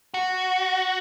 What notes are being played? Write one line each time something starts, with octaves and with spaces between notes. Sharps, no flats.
F#4